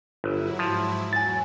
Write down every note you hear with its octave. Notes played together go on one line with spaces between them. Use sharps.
G1 F#3 E4
G#2 F3
E2 F#3 G#5 A6